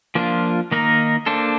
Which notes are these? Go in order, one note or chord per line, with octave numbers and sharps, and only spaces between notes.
F3 A#3 D4 F4
D#3 A#3 D#4 A#4
A#3 D4 A4 C5